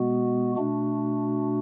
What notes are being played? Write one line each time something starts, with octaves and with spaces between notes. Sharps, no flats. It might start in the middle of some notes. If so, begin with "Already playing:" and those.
Already playing: B2 G#3 B3 F#4
B2 A3 D4 F#4